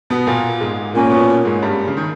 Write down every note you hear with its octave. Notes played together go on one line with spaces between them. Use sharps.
B2 B3
A#2 A#3
G#2 G#3
A#2 A#3 C#4
B2 B3
G#2 G#3
G2 G3
C#3
D#3